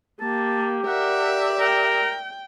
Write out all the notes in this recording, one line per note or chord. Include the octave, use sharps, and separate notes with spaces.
A#3 G4 A5
A#4 D5 E5 F#5
A#4 G5